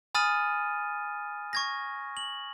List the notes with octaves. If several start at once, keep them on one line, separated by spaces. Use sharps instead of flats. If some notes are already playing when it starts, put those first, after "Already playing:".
G#5 B5 D#6 F6 A6 D#7
C#6 G#6 A#6
F#7